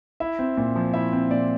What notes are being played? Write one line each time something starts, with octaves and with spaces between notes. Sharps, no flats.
E4 E5
C4
A#2
F3
E4 E5
C4
A#2 D5